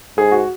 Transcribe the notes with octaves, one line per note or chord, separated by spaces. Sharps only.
G#2 G#4
F#4